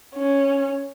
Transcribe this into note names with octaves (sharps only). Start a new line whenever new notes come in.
C#4